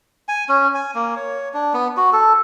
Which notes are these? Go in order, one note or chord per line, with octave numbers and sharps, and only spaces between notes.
G#5
C#4
G#5
A#3
C#5
D4
B3
F#4
A4